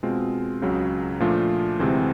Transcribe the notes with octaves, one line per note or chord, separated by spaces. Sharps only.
B2 G#3 C4 F4
C#2 C#3 F#3
A#2 F3 A3 D4 F4
D2 C3 E3 G#3 C4